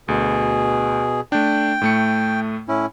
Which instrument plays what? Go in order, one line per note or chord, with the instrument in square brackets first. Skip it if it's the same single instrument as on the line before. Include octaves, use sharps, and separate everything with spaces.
[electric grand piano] D2 [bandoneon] B2 G#4
[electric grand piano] A3 D4 [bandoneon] G5
[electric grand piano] A2 A3 C#7
[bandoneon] A2 C#4 E4